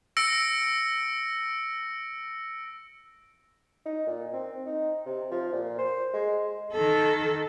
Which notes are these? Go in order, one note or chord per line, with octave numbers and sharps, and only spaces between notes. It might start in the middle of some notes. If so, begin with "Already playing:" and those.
E6 A#6 C#7 D7
D#4
A#2
C4
D#4
C3
F3
A#2
C5
G#3
D#3 A4